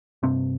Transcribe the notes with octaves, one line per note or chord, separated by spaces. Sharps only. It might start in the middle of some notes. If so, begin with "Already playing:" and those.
G2 C3 C4